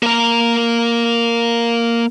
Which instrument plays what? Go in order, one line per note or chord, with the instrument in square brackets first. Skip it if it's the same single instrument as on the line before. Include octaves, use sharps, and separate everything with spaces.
[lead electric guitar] A#3 A#5